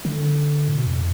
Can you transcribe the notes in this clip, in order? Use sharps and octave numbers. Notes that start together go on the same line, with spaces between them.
D3
A2
B2
F2